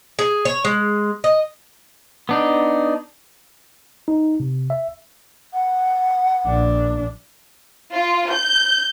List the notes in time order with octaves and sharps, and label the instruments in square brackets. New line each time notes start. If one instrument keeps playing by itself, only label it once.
[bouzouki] G#4
C#5
G#3
D#5
[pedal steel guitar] B3 D4 D#4
[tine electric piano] D#4
C3
E5
[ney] F#5
[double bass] A#1 D4
[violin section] F4
G6